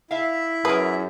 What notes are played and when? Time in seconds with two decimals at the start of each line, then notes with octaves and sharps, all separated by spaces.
0.11 E4 E5 F5
0.65 F#2 G#4 A#4 B4